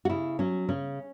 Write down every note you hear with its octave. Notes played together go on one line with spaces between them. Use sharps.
F#4
C#3 E4
F#3 C#4
C#3 C#4